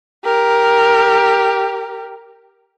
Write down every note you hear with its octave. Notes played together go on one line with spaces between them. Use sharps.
G4 A#4